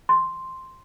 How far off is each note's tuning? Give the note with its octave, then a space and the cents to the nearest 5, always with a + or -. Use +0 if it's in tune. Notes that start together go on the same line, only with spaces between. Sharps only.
C6 +0